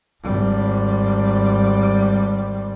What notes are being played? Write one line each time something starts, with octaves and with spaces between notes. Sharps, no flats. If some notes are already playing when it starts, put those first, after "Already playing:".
G#1 G3